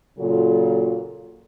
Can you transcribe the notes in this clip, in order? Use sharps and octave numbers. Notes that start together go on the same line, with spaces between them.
A#2 C#3 F#3 F4 A4